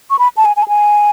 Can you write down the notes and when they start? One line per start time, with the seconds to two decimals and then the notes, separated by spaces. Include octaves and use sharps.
0.10 C#6
0.19 B5
0.37 A5
0.45 G#5
0.56 G#5
0.63 A5
0.68 G#5